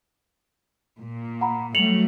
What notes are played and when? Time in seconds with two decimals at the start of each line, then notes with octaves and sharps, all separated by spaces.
0.98 A#2
1.41 F#5 A#5 B5
1.75 F#3 G3 A3 C#7 F7 F#7